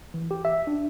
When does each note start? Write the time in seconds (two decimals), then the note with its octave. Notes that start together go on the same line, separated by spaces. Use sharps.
0.14 E3
0.31 G4
0.45 E5
0.67 D4